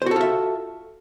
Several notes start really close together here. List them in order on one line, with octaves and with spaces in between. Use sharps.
C5 F#4 A4 F4 E5